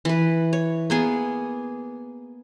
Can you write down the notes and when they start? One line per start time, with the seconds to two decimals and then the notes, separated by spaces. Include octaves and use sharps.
0.05 E3 B4
0.53 C#5
0.90 A#3 B3 G#4